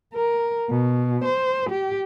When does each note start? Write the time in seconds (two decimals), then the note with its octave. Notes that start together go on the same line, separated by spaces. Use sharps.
0.15 A#4
0.70 B2
1.25 C5
1.70 G4